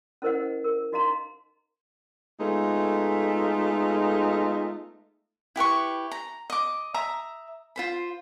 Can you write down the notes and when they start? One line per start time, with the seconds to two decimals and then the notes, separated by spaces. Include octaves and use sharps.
0.22 C#4 E4 A#4 C5 D#5 F#5
0.64 A#4
0.92 D#4 F#4 D#5 F5 A#5 C6
2.40 G#3 A3 B3 D#4 F4 A4
5.56 E4 G4 B4 C#6
6.11 A#5
6.50 D#5 D6
6.94 E5 A#5 D#6
7.76 F4 C5 B5